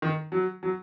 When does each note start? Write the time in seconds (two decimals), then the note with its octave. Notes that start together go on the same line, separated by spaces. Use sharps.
0.02 D#3
0.32 F#3
0.63 F#3